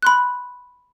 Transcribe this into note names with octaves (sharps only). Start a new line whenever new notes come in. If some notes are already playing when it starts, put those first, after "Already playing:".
B5 C6 F#6